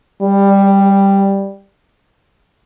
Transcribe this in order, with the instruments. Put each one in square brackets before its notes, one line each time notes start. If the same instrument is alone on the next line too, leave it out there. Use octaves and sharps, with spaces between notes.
[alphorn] G3